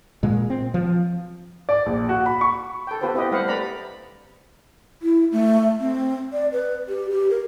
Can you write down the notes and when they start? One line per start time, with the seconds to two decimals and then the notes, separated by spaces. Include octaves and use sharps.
0.23 A#2 G#3
0.50 C4
0.74 F3
1.69 D5
1.86 A#1
2.09 F#4
2.26 B5
2.41 C#6
2.87 A4 G5
3.01 B3 F4 G4 B4 C5
3.14 C4 E4 G4 B4 D#5
3.31 G3 A3 B4 C5 F5 F#5
3.48 A3 B4 D5 A#5 B5
5.02 E4
5.32 A3
5.80 C4
6.33 D5
6.52 B4
6.89 G4
7.11 G4
7.30 A#4